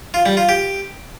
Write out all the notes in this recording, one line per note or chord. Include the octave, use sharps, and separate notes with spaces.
F4
G3
F4
G4